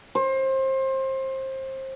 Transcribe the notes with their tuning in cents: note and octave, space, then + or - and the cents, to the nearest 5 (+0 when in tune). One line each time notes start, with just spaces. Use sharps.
C5 +25